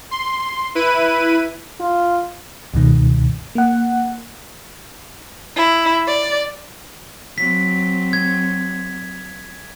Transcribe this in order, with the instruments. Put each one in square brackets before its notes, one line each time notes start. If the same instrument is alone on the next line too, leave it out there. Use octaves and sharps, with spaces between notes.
[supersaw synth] C6
E4 B4 D#7
[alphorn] F4
[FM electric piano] C#2 G2 B2 D#3
A#3 F#5
[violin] E4
D5
[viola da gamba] F#3 C4 [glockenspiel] B6
[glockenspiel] G#6